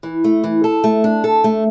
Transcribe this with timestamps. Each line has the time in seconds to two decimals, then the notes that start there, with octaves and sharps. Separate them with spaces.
0.03 E3
0.24 A3
0.44 E3
0.64 A4
0.84 A3
1.04 D4
1.24 A4
1.44 A3